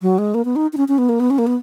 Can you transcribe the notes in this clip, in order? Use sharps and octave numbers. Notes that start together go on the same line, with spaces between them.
F#3
G#3
A#3
B3
D#4
D#4
C#4
C#4
B3
A#3
B3
C#4
A#3
B3